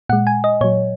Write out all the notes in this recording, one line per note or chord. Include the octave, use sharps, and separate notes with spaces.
A#2 G#3 F#5
G#5
D#5
A#2 F#3 C#5